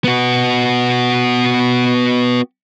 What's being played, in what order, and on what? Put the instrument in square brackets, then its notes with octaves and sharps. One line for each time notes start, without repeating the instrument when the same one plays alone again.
[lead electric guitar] B3 F#4